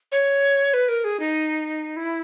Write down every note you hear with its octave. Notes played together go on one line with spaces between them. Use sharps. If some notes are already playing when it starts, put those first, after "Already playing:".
C#5
B4
A#4
G#4
D#4
E4